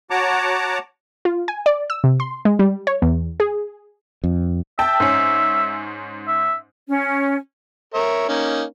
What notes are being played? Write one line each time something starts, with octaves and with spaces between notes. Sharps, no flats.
F#4 C#5 F#5 A5 A#5 D6
F4
G#5
D5
E6
C3
C6
G#3
G3
C#5
E2
G#4
F2
E5 G5 A5
G#2 C#4
E5
C#4
A#4 C#5 E5
A#3 C#4 D#4